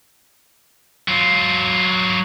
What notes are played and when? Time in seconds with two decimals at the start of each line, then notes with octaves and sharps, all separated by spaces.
1.08 F#3 F4